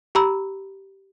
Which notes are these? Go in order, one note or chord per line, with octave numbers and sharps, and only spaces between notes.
G4 A#5 B5 E6